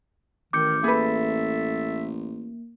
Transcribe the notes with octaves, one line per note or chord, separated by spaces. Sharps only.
A1 D#3 D6 G6 C#7
A#3 G#4 A4 B4 E5